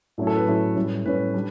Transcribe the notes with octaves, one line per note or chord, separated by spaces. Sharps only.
A2 F#3 A3 C#4 E4
A4
B4
A2 F#3 A3 C#4 E4
A2 G3 C#4
A2 G3 C#4 B4
G3 D4